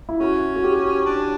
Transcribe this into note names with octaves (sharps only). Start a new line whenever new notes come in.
E4
C#4 F#4
F#4
G4
D4